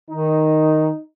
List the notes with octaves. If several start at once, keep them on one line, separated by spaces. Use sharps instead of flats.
D#3 D#4